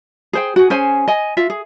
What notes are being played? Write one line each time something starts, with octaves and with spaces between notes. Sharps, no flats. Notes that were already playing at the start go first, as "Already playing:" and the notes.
G#4 C5 G5
F#4 G#4
C#4 G#4 C5 G#5
D#5 G#5
F4 E5
G#4